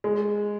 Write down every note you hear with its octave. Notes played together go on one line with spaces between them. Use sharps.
G#3